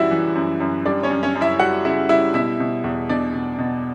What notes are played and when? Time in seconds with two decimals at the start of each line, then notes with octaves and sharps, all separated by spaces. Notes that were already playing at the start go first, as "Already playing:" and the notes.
Already playing: F#2 E3 G3 E4 F#4 D5 E5
0.11 E3
0.35 F#2
0.60 F#2
0.86 G3 D4 D5
1.03 C#4 C#5
1.11 F#2
1.23 C#4 C#5
1.35 F#2
1.41 E4 E5
1.59 G3 F#4 F#5
1.85 C#3 E4 E5
2.09 G3 E4 E5
2.34 B2 E4 E5
2.60 B2
2.84 E2
3.09 B2 D4 D5
3.34 B2
3.58 B2